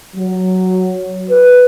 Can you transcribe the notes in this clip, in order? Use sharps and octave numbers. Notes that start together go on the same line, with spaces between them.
F#3
B4